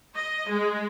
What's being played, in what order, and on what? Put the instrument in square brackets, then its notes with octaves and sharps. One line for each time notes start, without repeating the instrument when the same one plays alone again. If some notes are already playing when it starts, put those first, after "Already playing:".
[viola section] D#5
G#3